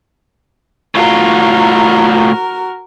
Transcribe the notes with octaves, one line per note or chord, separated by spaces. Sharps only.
A2 F4 F#4 A#4